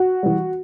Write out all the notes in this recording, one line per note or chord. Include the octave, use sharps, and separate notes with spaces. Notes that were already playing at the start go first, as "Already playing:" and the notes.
Already playing: F#4
E3 G3